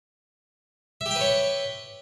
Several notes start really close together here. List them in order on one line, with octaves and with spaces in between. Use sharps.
E5 G4 G5 B4 C#5